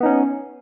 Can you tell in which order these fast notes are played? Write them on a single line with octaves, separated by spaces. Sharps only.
B3 D#4 C#4